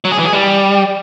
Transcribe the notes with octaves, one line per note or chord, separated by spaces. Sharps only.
F#3
G#4
E3
G#4
G3